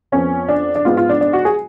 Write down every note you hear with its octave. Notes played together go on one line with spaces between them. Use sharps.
F2 F3 B3 C#4
D4
D4
G#2 G#3 B3 F4
F4
D4
D4
F#4
G#4